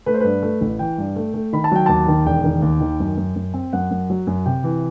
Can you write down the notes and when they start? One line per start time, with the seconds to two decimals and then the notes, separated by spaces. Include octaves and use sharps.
0.06 A3 B4
0.14 C5
0.20 G2 B4
0.42 A3
0.61 A1
0.79 E3 G5
0.98 G2
1.16 A3
1.34 A3
1.53 D#3 B5
1.64 A5
1.72 F#3 G5
1.86 D#2 A5
2.08 D#3
2.26 E1 G5
2.44 D#3
2.62 D#2
2.81 D#3
3.00 F#2
3.17 F#2
3.36 F#2
3.54 C4
3.73 F#2 F#5
3.91 F#2
4.10 F#3
4.27 F#2
4.46 C3 G5
4.64 E3